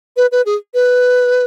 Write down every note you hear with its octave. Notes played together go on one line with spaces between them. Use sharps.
B4
B4
G#4
B4